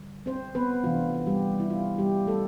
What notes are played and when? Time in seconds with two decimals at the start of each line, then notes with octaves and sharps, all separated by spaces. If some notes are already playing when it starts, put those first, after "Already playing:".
Already playing: D3 G3
0.26 C4 C5
0.55 B3 B4
0.84 C3 E3 A3 D4 F4
1.27 G3 G4
1.60 E4
1.70 F4
1.98 G3 G4
2.27 A3 A4